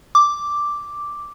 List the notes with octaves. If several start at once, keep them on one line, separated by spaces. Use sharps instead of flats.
D6